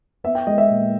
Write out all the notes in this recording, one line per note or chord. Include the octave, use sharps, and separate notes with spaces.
B3 E5
G5
G#3 D#5
E5
A#2